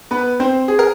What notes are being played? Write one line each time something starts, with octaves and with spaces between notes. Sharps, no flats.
B3 B4
C4 C5
G#4
A#4